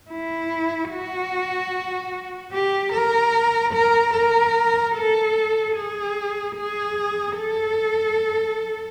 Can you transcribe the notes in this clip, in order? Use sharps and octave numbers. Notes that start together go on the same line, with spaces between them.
E4
F#4
G4
A#4
A#4
A#4
A4
G#4
G#4
A4